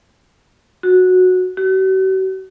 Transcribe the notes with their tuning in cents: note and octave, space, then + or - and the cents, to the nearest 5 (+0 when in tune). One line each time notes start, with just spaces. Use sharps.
F#4 -10
F#4 +45